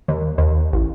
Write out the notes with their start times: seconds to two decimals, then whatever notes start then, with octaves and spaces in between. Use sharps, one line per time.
0.08 D#2
0.38 D#2
0.73 A1